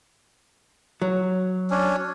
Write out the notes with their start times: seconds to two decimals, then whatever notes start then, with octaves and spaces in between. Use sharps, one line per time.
1.02 F#3
1.71 C#4 D4